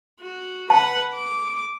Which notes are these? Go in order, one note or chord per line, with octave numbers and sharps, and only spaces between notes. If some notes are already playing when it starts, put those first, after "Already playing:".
F#4
B4 F#5 A5
D6